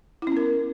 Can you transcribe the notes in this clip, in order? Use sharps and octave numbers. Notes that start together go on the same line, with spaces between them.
B3 C#4 E4 A#4